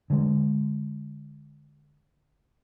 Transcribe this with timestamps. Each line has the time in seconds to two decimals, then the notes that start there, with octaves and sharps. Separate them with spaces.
0.10 D3 G#3